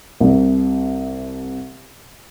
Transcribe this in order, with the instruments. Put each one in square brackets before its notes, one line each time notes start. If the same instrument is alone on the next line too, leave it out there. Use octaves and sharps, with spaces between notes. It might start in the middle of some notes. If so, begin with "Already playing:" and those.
[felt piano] C2 C3